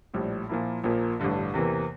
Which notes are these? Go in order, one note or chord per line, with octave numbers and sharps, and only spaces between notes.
A#1 A2 G3
A#2 F3 A#3 E4
A#1 A#2 F3 A#3
A1 G2 D3
E2 C3 E3 A#3